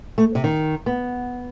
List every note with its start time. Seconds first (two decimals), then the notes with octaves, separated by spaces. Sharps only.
0.18 A3
0.35 C3
0.44 D#3
0.86 B3